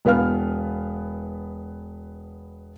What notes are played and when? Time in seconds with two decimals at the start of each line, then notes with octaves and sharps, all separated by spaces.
0.05 E1 B3 B4 F5 F6